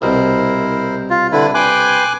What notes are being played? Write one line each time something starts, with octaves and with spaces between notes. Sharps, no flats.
C2 B2 E4 A#4 C5
F4
D3 D4 E4 B4
B4 G5 G#5 C6 D6 F#6